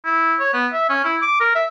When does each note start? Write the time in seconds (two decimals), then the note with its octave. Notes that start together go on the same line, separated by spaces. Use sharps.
0.05 E4
0.39 C#5
0.53 B3
0.73 E5
0.90 C#4
1.04 E4
1.22 D6
1.40 A#4
1.55 E5